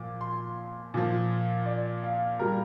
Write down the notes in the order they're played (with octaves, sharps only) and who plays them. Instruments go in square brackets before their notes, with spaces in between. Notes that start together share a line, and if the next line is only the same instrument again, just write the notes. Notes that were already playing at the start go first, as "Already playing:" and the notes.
Already playing: [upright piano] A#2 F3 D6
C6
A#2 F3
D5
F5
A#2 G3 A#4